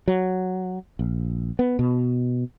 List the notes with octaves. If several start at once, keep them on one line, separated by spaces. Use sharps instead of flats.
F#3
A#1
B3
B2